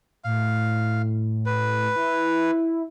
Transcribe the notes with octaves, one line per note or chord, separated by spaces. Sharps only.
A2 F5
B4
E4